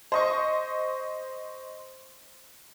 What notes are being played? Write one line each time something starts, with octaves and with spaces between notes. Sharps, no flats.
C5 D#5 C#6